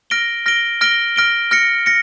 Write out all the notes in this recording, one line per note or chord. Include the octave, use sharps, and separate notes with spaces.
F6 A#6 D7 G7
F6 A#6 D7 G7
F6 A#6 D7 G7
F6 A#6 D7 G7
F6 A#6 C#7
A#6 C#7